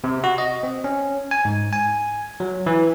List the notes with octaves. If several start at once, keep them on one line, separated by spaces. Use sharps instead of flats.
C3
F#4
D#5
C4
C#4
G#5
G#2
G#5
F#3
E3